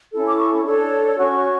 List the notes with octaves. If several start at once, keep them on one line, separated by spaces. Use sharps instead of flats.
C#4 E4 A4
D6
C#6
D4 A4 C#5
C#4 F#4 C#5 C#6